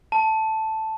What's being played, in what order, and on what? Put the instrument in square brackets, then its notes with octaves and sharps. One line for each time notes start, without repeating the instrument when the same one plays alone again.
[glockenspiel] A5